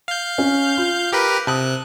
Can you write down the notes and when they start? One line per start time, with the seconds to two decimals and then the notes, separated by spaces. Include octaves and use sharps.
0.08 F5 G6
0.38 C#4
0.77 F4
1.12 G4 A#4 B4
1.47 C3 A5 D#6 F#6